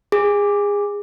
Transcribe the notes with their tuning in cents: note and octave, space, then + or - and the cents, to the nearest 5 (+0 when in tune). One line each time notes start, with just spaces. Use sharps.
G#4 -25